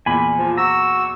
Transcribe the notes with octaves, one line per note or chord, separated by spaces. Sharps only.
E2 A#2 G#5 B5
F3
F#4 A#5 E6